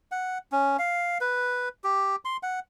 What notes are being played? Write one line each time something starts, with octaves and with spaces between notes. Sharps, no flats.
F#5
C#4
F5
B4
G4
C6
F#5